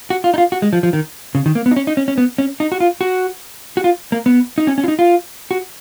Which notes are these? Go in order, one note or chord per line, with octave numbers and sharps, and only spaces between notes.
F#4
F4
D#4
F4
F#4
G#3
F3
F3
D#3
C#3
D#3
A#3
B3
D#4
C#4
D#4
C#4
C#4
B3
C#4
D#4
F#4
F4
F#4
F#4
F4
A#3
B3
D#4
C#4
C#4
F4
D#4
F4
F#4